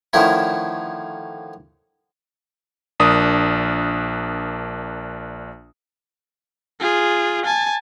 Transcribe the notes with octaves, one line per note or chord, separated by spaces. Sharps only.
D3 D#3 F3 A3 C#4 E4
A#1 D4 A#4 D#6
F4 G#4
G#5 A5